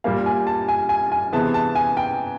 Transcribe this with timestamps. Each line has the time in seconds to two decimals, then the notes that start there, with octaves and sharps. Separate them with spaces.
0.04 A#2 G3 A#3 F5
0.26 G#5
0.47 A5
0.68 G#5
0.89 G#5
1.12 G#5
1.33 C3 E3 G#3 B3 A5
1.54 A5
1.75 G#5
1.97 G5